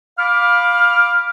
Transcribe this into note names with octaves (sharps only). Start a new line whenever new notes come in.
F5 B5 D6 F6